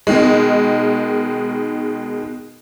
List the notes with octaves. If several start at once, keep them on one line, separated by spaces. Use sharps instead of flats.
B2 D#3 G#3